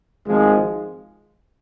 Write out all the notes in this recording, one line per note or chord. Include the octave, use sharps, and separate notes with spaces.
G#1 G#2 F3 G#3